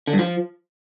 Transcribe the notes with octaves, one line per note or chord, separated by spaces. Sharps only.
D3
G2
F3